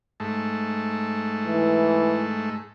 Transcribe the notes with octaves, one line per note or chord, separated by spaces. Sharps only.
G#2 A3
E3